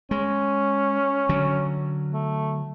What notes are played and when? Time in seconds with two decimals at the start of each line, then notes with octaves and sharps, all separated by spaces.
0.11 G#3 C#4
1.29 D3 F#3
2.13 A3